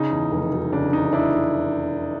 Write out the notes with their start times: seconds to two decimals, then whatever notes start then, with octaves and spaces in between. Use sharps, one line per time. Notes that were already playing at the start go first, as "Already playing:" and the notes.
Already playing: C#3 D#4
0.11 E2
0.32 F1
0.53 F#3
0.73 C#3 D4
0.93 E2 D#4
1.13 D4 E4